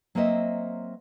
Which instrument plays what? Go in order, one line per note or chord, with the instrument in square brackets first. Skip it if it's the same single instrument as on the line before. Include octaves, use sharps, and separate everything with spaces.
[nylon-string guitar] F#3 A#3 C4 C5 D#5 E5